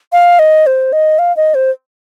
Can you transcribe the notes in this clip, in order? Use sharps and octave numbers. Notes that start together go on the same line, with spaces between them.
F5
D#5
C5
D#5
F5
D#5
C5